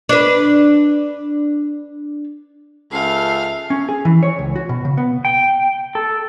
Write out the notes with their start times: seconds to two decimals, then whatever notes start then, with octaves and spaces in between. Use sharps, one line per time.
0.09 D4 B4
2.92 C#2 A4 E5 F5
3.70 C#4
3.89 G#4
4.05 E3
4.23 C#5
4.39 C#2
4.56 F#4
4.69 B2
4.85 C#3
4.98 B3
5.25 G5
5.95 A4